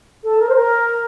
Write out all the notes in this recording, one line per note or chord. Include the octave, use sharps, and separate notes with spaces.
A4
A#4
C5
A#4